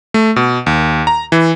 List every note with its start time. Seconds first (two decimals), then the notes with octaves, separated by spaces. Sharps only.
0.14 A3
0.36 B2
0.66 D#2
1.07 A#5
1.32 E3